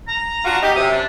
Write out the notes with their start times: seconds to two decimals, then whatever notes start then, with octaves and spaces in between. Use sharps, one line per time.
0.08 A#5
0.45 D4 F4 F#4
0.63 B3 D#4 G4
0.76 F#2 C3 D#6
0.92 D4